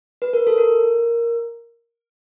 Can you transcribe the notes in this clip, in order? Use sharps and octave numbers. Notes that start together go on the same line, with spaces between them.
B4
A#4
A4
A#4